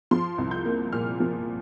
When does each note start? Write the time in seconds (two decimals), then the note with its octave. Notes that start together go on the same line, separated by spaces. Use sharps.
0.11 F3 C6
0.38 C2
0.51 G6
0.65 A#3
0.92 A#2 F6
1.20 F3